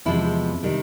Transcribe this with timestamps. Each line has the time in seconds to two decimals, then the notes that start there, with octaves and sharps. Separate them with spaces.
0.05 E2 C3 F3 G#3 E4
0.63 C3 D#3 G3